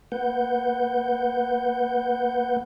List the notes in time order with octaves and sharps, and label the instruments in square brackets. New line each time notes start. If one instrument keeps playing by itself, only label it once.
[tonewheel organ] A#3 B4 F#5 G6